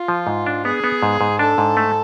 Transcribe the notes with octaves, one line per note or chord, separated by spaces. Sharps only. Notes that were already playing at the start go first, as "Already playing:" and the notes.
Already playing: F4
F3
G#2
D4
B3 G#4
B3
G#2
G#2
D4 A4
G#2
A3